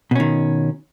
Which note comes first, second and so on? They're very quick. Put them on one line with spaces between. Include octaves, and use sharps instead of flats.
B2 C#4 D#3